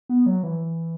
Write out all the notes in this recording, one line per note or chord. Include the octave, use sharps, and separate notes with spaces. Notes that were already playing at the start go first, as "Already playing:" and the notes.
B3
F#3
E3